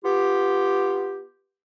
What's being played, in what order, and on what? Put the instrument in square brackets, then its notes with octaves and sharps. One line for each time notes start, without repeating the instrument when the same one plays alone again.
[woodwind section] B3 F4 G4